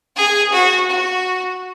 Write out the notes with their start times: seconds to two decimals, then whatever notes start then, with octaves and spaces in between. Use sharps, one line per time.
0.17 G#4
0.53 F#4
0.91 F#4